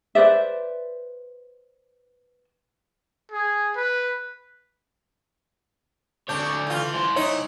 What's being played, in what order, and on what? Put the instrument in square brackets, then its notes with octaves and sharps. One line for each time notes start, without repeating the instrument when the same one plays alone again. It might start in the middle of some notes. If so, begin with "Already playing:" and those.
[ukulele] B4 C5 D5 E5
[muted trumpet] G#4
B4
[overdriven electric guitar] D3 C#5 [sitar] D4 [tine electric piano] G6
[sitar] E3 F4
[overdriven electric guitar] E4 C5
[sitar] D#4 [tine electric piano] C#5